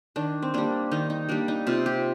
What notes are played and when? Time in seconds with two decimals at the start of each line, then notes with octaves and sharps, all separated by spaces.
0.16 D#3 D4
0.42 C4
0.54 G3 A#3 D4
0.91 D#3 D#4
1.10 D#4
1.29 G3 A#3 D4
1.48 D#4
1.67 C3 F4
1.86 G4